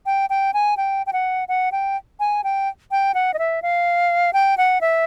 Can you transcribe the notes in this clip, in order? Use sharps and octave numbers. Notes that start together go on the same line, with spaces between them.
G5
G5
G#5
G5
G5
F#5
F#5
G5
G#5
G5
G5
F#5
D#5
E5
F5
G5
F#5
E5